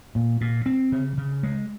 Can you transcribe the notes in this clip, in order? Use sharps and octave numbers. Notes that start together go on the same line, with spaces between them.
A#2
A#2
C4
C#3
C#3
G#3